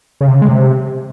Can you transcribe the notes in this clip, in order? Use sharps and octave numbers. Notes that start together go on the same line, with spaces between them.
C#3
C3
C#3
G#3
C3